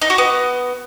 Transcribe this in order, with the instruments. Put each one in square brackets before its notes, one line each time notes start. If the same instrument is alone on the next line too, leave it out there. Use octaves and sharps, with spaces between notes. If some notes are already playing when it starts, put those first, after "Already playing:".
[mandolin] D#4
F#4
B3